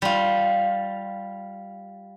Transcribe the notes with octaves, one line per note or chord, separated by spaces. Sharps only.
G3 F4